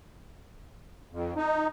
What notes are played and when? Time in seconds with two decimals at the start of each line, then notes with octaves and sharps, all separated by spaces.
1.12 F2
1.37 D#4